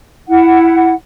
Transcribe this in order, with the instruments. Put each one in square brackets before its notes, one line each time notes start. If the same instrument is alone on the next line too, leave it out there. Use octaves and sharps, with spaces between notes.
[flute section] E4 F#5